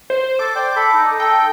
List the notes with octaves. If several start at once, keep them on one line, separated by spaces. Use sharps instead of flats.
C5
A4 D6
C5 D5 G5
A4 B5
D#4
A4 G5